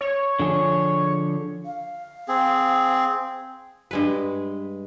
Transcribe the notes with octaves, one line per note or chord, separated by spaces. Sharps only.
C#5
D3 F3 G#4
F5
C4 G#4
G2 G#3 B4